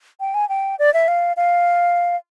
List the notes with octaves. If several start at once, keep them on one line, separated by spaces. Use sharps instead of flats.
G5
G#5
G5
D5
E5
F5
F5